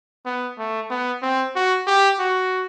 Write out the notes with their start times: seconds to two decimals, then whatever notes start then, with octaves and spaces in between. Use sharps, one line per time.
0.26 B3
0.58 A3
0.90 B3
1.22 C4
1.55 F#4
1.87 G4
2.19 F#4